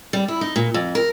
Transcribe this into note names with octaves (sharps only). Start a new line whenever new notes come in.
G3
E4
D#4
A#2
F2
A#4